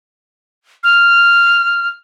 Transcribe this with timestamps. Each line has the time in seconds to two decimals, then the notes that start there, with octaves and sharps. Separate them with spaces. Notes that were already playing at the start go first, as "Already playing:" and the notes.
0.84 F6